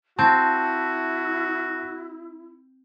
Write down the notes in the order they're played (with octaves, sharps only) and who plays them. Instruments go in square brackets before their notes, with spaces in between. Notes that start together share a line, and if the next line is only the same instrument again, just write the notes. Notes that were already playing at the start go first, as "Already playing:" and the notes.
[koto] C4 [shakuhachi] E4 [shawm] F#4 [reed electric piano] A5